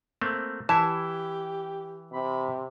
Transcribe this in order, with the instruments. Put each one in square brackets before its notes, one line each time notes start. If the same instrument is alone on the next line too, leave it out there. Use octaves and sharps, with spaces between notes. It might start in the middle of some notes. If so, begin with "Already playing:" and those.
[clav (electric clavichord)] A3 A#3 C4
[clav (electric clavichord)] E3 E4 E5 [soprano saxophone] G4 [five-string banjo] A5
[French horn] C3 [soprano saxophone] B5